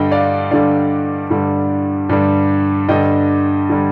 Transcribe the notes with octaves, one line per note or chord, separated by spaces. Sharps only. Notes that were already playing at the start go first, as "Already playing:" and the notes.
Already playing: G2 D3 G3 D#5 G5
D5 F5
G2 D3 G3 D5 F5
G2 D3 G3
G2 D3 G3
G2 D3 G3 D#5 G5
D3 G3